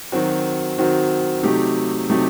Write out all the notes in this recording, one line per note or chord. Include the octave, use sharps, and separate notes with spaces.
D#3 F#3 C4 F#4
D#3 F#3 C4 F#4
C3 F#3 A3 D#4 G4
C3 F#3 A3 D#4 G4